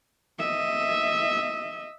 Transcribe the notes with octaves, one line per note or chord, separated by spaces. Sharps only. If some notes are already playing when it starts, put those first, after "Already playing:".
D#5 E5